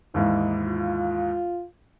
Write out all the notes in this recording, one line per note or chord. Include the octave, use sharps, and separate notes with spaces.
D#2 G#2 E3 D#4
F4